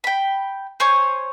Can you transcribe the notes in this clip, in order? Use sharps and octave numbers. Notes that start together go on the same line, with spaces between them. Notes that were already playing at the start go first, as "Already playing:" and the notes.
G5 B5
C5 C#5 G#5 C#6